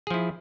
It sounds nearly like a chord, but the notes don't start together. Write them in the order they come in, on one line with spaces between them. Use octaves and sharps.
G#4 F3 E4